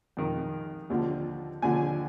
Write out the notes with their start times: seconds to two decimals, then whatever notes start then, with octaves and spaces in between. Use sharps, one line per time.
0.17 F2 D#3
0.90 D#2 D3 F3
1.62 D#2 D3 F3 G#5